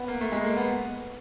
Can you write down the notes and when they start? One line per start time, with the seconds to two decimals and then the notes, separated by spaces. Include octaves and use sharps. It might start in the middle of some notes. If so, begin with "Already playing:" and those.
Already playing: B3
0.08 A#3
0.21 A3
0.32 G#3
0.44 A#3
0.56 B3